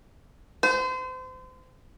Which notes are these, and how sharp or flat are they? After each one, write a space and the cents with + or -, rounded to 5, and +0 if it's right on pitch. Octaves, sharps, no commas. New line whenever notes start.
C5 -35